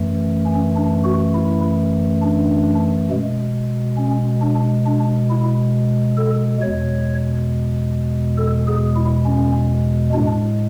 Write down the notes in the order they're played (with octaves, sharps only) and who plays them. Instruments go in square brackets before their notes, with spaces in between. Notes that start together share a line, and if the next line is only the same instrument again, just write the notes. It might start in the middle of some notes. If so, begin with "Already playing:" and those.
Already playing: [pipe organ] F#2 E3 A3
C#4
D4
F#4
E4
D4
B2 G#3
C#4
D4
D4
E4
A4
E2 B2 G#3 C#5
A4
G#4
E4
C#4
A2 G#3 D4